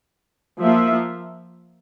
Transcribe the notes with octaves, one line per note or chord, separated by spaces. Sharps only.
F3 A#3 F4 E5